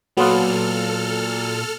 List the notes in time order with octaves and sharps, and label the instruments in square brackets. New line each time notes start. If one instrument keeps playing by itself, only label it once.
[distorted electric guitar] A#2 [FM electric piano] F#3 [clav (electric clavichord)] B3 F4 [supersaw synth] A4 F6